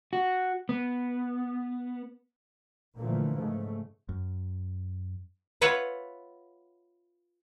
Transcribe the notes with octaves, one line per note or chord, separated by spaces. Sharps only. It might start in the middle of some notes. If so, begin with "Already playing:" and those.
F#4
B3
A#2 D3 E3 F3 A3 A#3
G#2 C#3 A3
F#2
F4 B4 C#5 E5 F#5